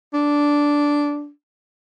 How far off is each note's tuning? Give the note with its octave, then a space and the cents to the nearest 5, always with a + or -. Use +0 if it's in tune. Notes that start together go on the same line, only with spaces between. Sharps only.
D4 -10